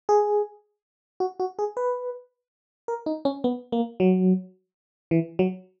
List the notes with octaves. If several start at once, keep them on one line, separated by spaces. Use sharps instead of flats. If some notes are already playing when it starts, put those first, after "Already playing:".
G#4
F#4
F#4
G#4
B4
A#4
D#4
C#4
B3
A#3
F#3
E3
F#3